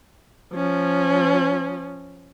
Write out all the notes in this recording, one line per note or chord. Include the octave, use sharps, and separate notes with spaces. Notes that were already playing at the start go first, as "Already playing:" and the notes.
F3 C#4